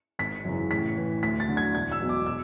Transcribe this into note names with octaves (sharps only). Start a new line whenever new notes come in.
G#1 B6
F#2 C#3 E3
A1 B6
A2 E3
D2 B6
A6
D3 F#3
G#6
E1 G#6
E6
E2 B2 F#3
D6
E6